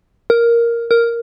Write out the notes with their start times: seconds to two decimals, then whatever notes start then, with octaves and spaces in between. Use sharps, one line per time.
0.30 A#4
0.91 A#4